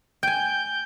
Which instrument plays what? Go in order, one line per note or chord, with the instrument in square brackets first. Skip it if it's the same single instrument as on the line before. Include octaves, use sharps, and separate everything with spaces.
[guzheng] G5 G#5 [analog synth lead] G6